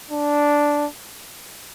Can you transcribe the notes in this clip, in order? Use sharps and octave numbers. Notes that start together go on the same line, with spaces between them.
D4